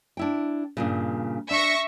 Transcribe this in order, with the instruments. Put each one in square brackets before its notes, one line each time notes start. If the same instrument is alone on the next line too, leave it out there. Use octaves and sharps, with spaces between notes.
[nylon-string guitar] D4 E4 G5
G2 A#2 C#3
[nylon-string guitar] D4 [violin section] E5 C#6 A#6